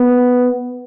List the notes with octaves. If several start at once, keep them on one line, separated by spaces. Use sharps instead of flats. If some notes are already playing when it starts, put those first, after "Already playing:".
Already playing: B3